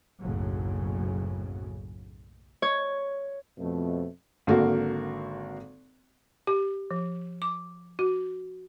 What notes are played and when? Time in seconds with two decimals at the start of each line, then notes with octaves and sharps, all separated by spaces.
0.21 F#1 B1 A2 C#3 F#3
2.62 C#5
3.58 F2 B2 A3
4.47 G#1 D3 A#3 F#4 A4
6.47 G4
6.91 F3
7.42 D6
7.99 F#4